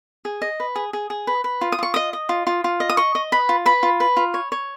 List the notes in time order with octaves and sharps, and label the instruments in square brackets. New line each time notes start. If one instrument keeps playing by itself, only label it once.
[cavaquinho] G#4
D#5
B4
G#4
G#4
G#4
B4
B4
F4
D#6
F4 C#6
D#5 D#6
D#5
F4
F4
F4
D#5
D#6
D#5 C#6
D#5
B4 B5
F4
B4 B5
F4
B4
F4
C#5
C#5